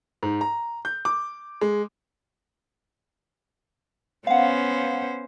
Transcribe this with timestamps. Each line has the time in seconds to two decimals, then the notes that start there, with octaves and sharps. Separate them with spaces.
0.23 G#2
0.41 A#5
0.85 G6
1.05 D6
1.61 G#3
4.27 B3 C#4 C5 F5 F#5